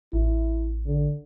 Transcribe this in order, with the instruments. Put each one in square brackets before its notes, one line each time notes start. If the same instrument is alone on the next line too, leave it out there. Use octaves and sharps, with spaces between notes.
[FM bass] A1 [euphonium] E4
[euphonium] D3